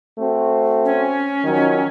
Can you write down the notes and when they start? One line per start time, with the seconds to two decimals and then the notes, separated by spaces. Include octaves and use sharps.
0.18 A3 C4 F#4
0.85 C#4
1.44 D#3 F3 F#3